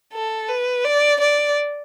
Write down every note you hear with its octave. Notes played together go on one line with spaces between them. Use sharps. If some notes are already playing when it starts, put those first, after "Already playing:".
A4
B4
D5
D5